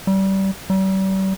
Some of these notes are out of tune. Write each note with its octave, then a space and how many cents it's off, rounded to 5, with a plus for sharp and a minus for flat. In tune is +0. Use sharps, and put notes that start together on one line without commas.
G3 -25
G3 -40